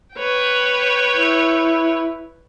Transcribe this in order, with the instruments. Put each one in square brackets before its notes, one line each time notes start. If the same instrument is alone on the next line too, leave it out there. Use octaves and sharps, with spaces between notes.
[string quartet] B4 C#5 G5
[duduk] E4